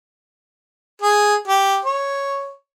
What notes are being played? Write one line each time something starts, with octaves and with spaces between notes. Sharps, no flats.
G#4
G4
C#5